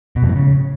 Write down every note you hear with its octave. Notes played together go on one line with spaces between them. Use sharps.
B2
F2
A2
C#3